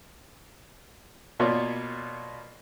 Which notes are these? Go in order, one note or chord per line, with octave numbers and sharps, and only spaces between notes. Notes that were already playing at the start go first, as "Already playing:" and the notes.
B2 A#3 B3 F4 C#5 D5